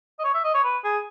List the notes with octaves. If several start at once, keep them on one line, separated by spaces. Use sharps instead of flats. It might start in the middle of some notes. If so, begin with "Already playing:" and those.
D#5
C#5
E5
D#5
C#5
B4
G#4